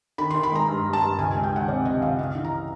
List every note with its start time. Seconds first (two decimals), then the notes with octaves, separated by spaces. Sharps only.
0.18 D#3 B5
0.31 C6
0.35 D#3
0.43 B5
0.52 G#3 A#5
0.68 G2
0.85 G2
0.93 A5
1.02 G2
1.18 C#2 G#5
1.31 G#5
1.35 G#3
1.43 G5
1.52 D#3 F#5
1.68 C3 D5
1.85 C3 D#5
2.02 C#2 F5
2.19 C#3 F5
2.35 E3
2.44 A#5